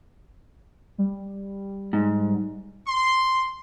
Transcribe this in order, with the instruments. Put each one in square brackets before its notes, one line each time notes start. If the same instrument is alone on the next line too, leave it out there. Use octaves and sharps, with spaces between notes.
[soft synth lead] G3
[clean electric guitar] G#2
[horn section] C6